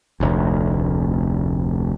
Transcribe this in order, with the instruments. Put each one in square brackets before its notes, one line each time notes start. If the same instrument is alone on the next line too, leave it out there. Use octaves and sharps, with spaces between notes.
[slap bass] F1 D2